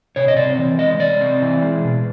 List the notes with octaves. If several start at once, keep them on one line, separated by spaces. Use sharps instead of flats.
C3 C#5
D#5
C4 D5
E3
G#3 D#5
C3 D5
C4
E3
G#3
B2